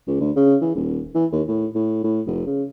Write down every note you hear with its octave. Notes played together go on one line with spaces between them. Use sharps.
C#2
D2
C#3
E3
D#1
E3
D#2
A2
A2
A2
F1
C#3